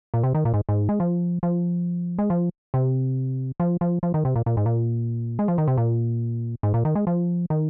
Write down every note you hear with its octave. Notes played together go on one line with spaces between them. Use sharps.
A#2
C3
D#3
A#2
G#2
G#2
G#3
F3
F3
G#3
F3
C3
F3
F3
F3
D#3
C3
A#2
A#2
G#2
A#2
G#3
F3
D#3
C3
A#2
G#2
A#2
D#3
G#3
F3
D#3